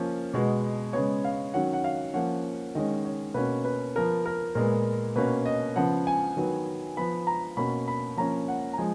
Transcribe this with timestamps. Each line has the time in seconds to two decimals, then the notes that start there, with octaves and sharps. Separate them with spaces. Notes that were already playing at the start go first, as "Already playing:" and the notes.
Already playing: F3 A#3 C#4
0.33 B2 G#3 B3
0.93 C#3 G#3 B3 C#5
1.24 F5
1.54 D#3 F#3 C#4 F#5
1.73 F#5
1.84 F5
2.14 F3 A#3 C#4 F#5
2.75 D#3 G#3 C#4 D#5
3.05 C#5
3.34 B2 A#3 C#4 B4
3.64 B4
3.96 F3 B3 A#4
4.26 A#4
4.55 A#2 G#3 B3 A#4
5.15 B2 A#3 C#4 B4
5.46 D#5
5.76 C#3 F3 B3 F#5
6.07 G#5
6.37 D#3 F#3 B3
6.97 F3 B3 B5
7.27 A#5
7.57 B2 A#3 C#4 B5
7.88 B5
8.17 F3 A#3 C#4 A#5
8.48 F#5
8.73 A#5
8.78 F3 G#3 G#5